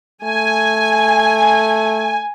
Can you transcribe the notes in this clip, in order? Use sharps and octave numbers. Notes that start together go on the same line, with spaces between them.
A3 G#5